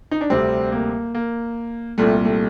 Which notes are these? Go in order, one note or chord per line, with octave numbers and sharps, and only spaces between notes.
D#4
D4
D2 C3 G3 C4
A#3
A#3
C2 A#2 G3 A3
A3